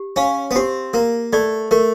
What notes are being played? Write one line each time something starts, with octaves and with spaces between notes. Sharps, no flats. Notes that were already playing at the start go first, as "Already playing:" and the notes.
Already playing: G4
C#4 F5
B3
C4 G4
A#3 A#4
A3 D5
A3 A#4